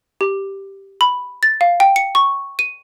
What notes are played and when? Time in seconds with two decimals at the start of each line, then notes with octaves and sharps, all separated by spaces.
0.21 G4
1.01 B5
1.43 A6
1.61 F5
1.80 G5
1.96 C#7
2.15 C#6
2.59 D#7